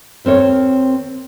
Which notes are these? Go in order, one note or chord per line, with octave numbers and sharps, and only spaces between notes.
D#2 C4 A#4 C#5